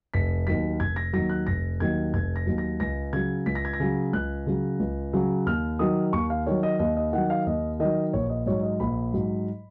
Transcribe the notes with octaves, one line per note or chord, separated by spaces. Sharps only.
F1 B6
D#2 D#3 F#3 B6
F1 G#6
A#6
D#2 D#3 F#3 A#6
F#6
F1 A#6
D#2 D#3 F#3 G#6
F1 G#6
A#6
D#2 D#3 F#3
A#6
C#2 A#6
C#3 F#3 G#6
C#2 B6
A#6
G#6
A#6
C#3 F#3
C#2 F#6
C#3 F#3
C#2
C#3 F#3
D#2 F6
D#3 F#3 D#6
D#2 C#6
F5
D#3 F#3 C#5
D#5
D#2 D#5
D#5
D#3 F#3 F#5
F5
D#2 D#5
D#3 F#3 D#5
A#1 C#5
D#5
G#2 F#3 C#5
D#5
A#1 B5
G#2 F#3